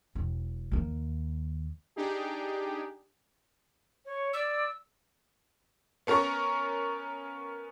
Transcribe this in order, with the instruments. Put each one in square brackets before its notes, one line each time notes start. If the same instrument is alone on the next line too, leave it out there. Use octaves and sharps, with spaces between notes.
[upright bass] E1
D#2 A#3
[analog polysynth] D4 D#4 G4 G#4
[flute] C#5
[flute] D5 [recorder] E6
[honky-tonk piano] B3 C#4 A#4 A#5 C#6